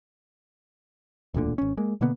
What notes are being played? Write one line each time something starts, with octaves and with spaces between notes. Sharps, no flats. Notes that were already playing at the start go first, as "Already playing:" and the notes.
E1 D2 A#2 D3
G#1 C#4
G#3 A#3
B2 D3 A#3 B3